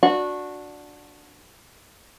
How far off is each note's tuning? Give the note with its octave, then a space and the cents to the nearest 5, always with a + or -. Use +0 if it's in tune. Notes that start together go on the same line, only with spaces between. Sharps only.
D4 +0 F#4 -20